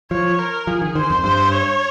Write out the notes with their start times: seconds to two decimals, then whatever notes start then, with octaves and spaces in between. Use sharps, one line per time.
0.11 F3 C#5
0.39 A#4
0.67 F3 G#4
0.82 D#3
0.95 D#3 C5
1.10 F2
1.24 G2 C5
1.52 C#5